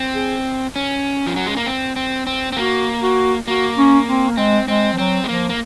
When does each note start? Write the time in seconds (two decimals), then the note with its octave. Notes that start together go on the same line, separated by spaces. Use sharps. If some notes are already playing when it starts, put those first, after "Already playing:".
Already playing: C4
0.15 G#4
0.76 C#4
1.27 F3
1.36 F#3
1.46 G#3
1.57 A#3
1.66 C4
1.96 C4
2.27 C4
2.52 C4
2.57 A#3 F#4
3.02 F#4
3.47 A#3 F#4
3.78 C#4
4.07 C4
4.29 A#3
4.37 G#3 C4
4.68 G#3 C4
4.93 F3
4.98 F#3 C4
5.24 G#3
5.28 F3 A#3
5.49 A#3